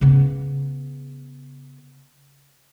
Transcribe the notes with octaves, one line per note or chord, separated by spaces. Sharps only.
C#3 B3